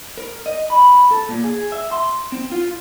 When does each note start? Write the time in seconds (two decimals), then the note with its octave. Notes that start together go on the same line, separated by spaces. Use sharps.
0.17 A#4
0.46 D#5
0.70 B5
1.11 A4
1.29 A#2
1.44 G#4
1.72 E5
1.92 C6
2.32 C4
2.52 F4